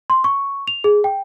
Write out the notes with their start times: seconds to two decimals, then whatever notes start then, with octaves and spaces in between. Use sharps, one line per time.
0.10 C6
0.24 C#6
0.68 F7
0.84 G#4
1.04 G5